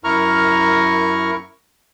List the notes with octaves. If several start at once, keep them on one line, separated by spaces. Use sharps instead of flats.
F#2 E4 A#4 A#5 C#6 F6